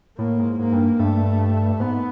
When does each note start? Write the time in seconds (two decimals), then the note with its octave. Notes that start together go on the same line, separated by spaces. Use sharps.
0.18 A2 A#3
0.39 G#2
0.59 G#2 A#3
0.72 G2
0.99 G2 A3
1.80 G#2 B3